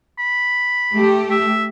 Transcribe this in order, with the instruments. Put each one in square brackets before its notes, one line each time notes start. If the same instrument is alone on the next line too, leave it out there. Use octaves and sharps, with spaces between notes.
[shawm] B5
[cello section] A3 G4
[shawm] E5